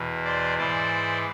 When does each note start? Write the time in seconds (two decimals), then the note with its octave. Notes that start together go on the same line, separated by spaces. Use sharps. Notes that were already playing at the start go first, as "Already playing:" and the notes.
Already playing: E2 B2
0.25 C5 D5
0.58 G#2 E3 C5 D5